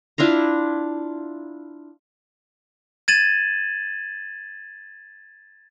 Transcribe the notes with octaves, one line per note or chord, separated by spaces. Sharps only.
D4 E4 F4 A#5
G#6 A6 D#7 E7 F#7